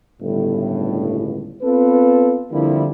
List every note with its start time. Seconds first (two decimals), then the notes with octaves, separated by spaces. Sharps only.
0.22 G1 C#2 A2
1.63 B3 C4 F4 A4 B4
2.51 F2 D3 F3 G3 A#3 E4